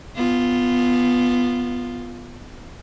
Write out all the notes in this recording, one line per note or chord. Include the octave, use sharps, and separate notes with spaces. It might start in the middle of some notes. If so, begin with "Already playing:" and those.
B3 F4